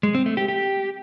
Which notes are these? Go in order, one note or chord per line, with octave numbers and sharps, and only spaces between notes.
G#3
C4
A3
G4
G4